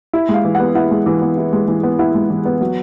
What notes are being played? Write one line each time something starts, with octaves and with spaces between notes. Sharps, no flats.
E4
G#3
F5
E3
F#5
B3
E4 F#5
G#3
E3
B3
E4
G#3
E3
B3
E4 F#5
G#3
E3
B3
F#3